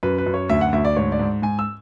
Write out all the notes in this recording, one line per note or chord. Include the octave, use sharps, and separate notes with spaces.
F#2 B4
B4
F#2
C#5
D2 E5
F#5
D2 E5
D5
G#2 C#5
D5
G#2
G#2 G#5
E6